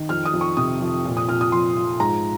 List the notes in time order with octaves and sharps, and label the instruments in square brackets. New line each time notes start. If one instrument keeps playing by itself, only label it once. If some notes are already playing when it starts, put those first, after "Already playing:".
Already playing: [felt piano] D#3
F2 F6
D#6
F2
C#6
C3 D#6
F2
A#2
D#6
A#2 F6
D#6
F3 C6
F3
G#2 A#5